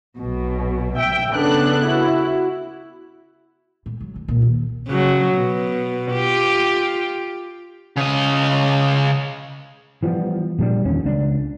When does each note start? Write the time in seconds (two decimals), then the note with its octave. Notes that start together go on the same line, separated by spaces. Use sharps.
0.17 B1 B2
0.97 E5 G5
1.32 C#3 B3 D4 A4 F#6
1.85 E4 F#4
3.86 A2
4.00 A2 F#3
4.16 D2
4.28 C2 A#2
4.42 D#2
4.88 C#3 F#3
5.34 B2
6.12 F4 G4
7.96 C#3 D#5
10.03 E3 F3 G3 B3
10.59 A#2 F3 G3 D4
10.85 E2 D#3 C#4
11.04 C#2 D4